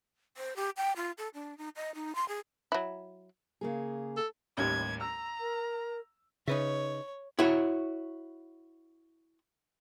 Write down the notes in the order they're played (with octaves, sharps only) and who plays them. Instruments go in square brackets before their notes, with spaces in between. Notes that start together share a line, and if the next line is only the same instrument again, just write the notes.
[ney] C5
G4
G5
F4
A4
D4
D#4
D#5
D#4
C6
G#4
[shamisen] F#3 E4
[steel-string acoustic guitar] C#3 A#3 G#4
[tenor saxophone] A4
[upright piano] A1 D#2 G3 [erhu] G#6
[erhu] A#5 [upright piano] E6
[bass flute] A#4
[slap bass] C#3 [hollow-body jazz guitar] D#4 B4 E5 [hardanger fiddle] C#5
[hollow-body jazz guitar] E4 F#4 C#5